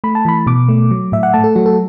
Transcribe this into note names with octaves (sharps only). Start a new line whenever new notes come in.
A3 B5
A5
E3 B5
B2 D6
A3
F#3
A2 E5
F#5
A3 A5
A4
F#3 F#4
A4